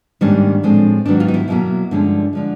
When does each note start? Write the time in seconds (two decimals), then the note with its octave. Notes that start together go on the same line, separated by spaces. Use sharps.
0.21 G#2 D#3 G3 A#3 C#4 D4
0.63 A2 F3 G#3 C4
1.06 G#2 D#3 F#3 B3 D4
1.20 F4
1.28 D#4
1.34 E4
1.48 B2 F#3 A#3 C#4 E4
1.91 G2 D3 F3 G#3 C#4
2.33 D3 F3 G#3